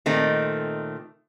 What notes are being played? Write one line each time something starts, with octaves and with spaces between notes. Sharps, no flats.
A#2 D#3 A3 C4